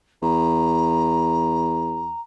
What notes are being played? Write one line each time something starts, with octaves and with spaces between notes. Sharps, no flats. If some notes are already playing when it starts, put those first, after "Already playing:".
E2 A#5